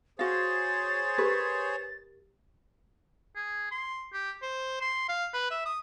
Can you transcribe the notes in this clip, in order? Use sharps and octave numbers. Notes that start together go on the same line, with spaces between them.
F#4 G#4 C5 C#5 F5 A6
G4 A#4 B4
G#4
C6
G4
C5
C6
F5
B4
E5
D#6